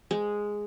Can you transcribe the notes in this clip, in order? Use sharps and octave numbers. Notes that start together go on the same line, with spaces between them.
G#3